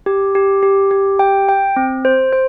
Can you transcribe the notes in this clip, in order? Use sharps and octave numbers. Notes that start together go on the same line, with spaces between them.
G4
G4
G4
G4
G5
G5
C4
C5
C5